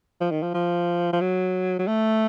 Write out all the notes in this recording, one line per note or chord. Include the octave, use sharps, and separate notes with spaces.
F3
D#3
F3
F3
F3
F#3
F#3
A3